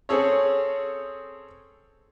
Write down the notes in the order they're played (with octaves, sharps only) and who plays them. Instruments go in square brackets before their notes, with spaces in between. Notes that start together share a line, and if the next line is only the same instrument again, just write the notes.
[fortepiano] C4 C#4 G#4 A4 C#5